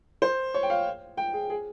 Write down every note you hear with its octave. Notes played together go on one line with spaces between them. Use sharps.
C5
C#5
G5
F5
G5
G#4
G#4